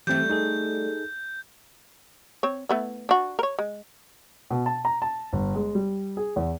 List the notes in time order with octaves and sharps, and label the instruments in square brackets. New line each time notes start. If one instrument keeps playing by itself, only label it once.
[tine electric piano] E3 C4 [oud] G3 A3 [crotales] G6
[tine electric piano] D#4 G#4 A4
[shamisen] C4 C#5
A3 B3 E4
D4 F#4
A#4 C#5
G#3
[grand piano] B2
A5
A#5
A5
G1
G#3
G3
G#4
E2